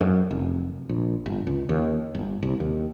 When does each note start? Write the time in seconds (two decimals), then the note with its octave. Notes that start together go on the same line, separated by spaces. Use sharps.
0.01 F#2
0.31 F1
0.89 A#1
1.26 G1
1.47 C#2
1.69 D#2
2.15 G1
2.43 C2
2.60 D#2